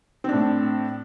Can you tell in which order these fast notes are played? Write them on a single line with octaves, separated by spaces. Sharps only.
C4 D4 A2